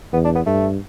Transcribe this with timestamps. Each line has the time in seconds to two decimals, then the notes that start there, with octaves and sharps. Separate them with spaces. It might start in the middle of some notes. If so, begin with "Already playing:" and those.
0.13 E2 B3
0.24 D4
0.35 B3
0.46 G2 A3